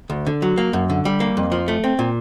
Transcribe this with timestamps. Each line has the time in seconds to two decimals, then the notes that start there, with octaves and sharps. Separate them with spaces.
0.10 D2
0.27 D3
0.42 F#3
0.58 A#3
0.73 F#2
0.90 D3
1.05 G3
1.20 A#3
1.37 F2
1.52 F3
1.68 A3
1.84 C4
1.99 A#2